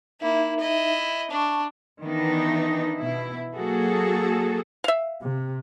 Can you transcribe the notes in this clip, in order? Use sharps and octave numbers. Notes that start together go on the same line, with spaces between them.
A#3 D#4 E4 E5
E4 D#5
D4 A5 C#6
D#3 E3 B3 D4 D#4
B2 E4
F#3 A#3 F#4 G#4 A4
E5 F5
C3